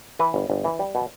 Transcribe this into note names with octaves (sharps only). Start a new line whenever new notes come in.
E3 B4
G1
G1
E3
G3
B2